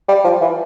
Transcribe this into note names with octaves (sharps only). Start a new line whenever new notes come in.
G3
F3
E3